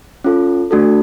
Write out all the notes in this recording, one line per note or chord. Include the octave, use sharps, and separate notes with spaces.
C#4 F4 A4
A3 D4 F#4 A4